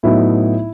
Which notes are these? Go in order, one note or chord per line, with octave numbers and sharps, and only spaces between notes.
A2 F#3 B3 D#4 E4